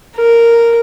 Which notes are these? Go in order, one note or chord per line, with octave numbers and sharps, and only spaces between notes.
A#4